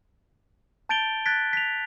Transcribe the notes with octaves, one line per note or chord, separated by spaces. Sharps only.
A5 G6 A6 D7 F7 G7
F#6 G#6 A6 B6 D7
B6 F7